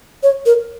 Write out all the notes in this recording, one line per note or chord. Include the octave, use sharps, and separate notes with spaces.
C#5
A#4